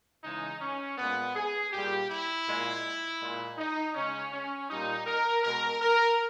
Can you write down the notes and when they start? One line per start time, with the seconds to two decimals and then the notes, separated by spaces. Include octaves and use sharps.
0.23 C#3 E3 G#3 D#4
0.61 C#4
0.98 A#2 G#3 B3
1.36 G#4
1.72 A#2 G3 G4
2.10 E4
2.47 A#2 G#3
3.20 A#2 G#3
3.58 D#4
3.95 C#3 G#3 C#4
4.33 C#4
4.69 A#2 G3 D#4
5.07 A#4
5.43 B2 G#3 A#4
5.81 A#4